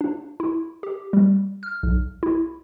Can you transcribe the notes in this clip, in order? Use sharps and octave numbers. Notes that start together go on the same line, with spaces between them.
D4
E4
G4
G3
F6
B1
E4